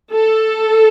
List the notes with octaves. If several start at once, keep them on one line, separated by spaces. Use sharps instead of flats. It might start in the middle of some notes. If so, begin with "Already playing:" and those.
A4